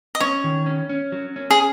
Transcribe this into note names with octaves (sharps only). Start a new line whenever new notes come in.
D#5
C#4 C#5
D#3
C#4
C#4
F#3
C#4
G#4